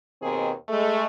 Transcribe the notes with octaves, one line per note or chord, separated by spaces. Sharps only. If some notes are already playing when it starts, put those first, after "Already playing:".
D#2 B2 D#3 C4 G#4
G#3 A3